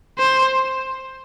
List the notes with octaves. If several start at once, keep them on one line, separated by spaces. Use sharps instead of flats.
C5